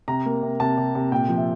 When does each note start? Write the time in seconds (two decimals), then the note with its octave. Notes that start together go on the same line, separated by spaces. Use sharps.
0.08 C3 A#5
0.25 A#3
0.43 C3
0.60 C3 A5
0.78 C3
0.95 C3
1.12 A#2 G5
1.29 F3
1.38 E5